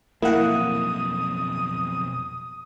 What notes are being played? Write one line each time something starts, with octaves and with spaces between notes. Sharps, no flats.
B1 F2 A#3 E4 F#5 D#6